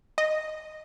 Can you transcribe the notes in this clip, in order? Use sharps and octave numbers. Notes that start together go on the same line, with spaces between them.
D#5